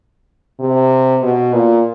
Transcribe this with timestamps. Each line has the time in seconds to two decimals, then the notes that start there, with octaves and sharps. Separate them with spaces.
0.60 C3
1.22 B2
1.53 A#2